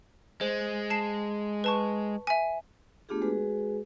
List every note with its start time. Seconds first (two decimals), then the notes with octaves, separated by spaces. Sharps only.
0.41 G#3 C5
0.90 A5 C7 E7
1.64 B4 A5 C#6
2.27 E5 G#5
3.09 A3 B3 D4 F4 G4 G#4
3.22 G#3 F#4 G#4 B4